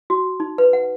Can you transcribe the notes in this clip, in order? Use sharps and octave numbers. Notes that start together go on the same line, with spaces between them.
F#4
D#4
B4
F#5